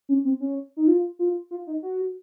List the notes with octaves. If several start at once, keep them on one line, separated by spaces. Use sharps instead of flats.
C#4
C4
C#4
D#4
F4
F4
F4
D#4
F#4